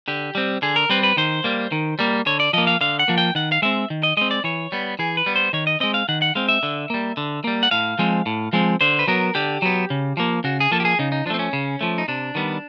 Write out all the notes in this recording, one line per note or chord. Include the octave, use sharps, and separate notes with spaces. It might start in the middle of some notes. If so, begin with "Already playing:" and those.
D3 G4
G3 C4
D3 G#4
A#4
G3 C4 B4
B4
D#3 C5
G3 A#3
D#3
G3 A#3
D3 C#5
D5
F3 A#3 D#5
F5
D3 F5
F#5
F3 A#3
G5
D#3 F#5
F5
G#3 C4 E5
D#3
D#5
G#3 C4 D#5
D5
E3 C#5
G3 B3
E3 G#4
B4
G3 B3
C5
D#3 C#5
D#5
G#3 C4 D#5
F5
D#3 F#5
F#5
G#3 C4 F5
E5
D3
G3 A#3
D3
G3 A#3
F#5
A2 F5
F3 G#3 C4
A2
F3 G#3 C4
D3 C5
B4
F#3 B3 A#4
D3 G4
F#3 B3
C#3
F3 A#3
C#3 F#4
G#4
F3 A#3 A4
G4
G#4
C#3 D#4
D#4
F3 A3 C4 D4
C#4
C#3
F3 A3
D#4
C3 D4
D#3 G3 B3